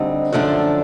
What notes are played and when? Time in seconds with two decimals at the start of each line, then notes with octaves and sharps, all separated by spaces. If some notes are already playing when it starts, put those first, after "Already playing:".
Already playing: D2 D3 G3 C4 D#4
0.32 F#2 D3 F3 A3 D4